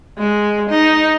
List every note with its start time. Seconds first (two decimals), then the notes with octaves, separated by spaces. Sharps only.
0.18 G#3
0.70 D#4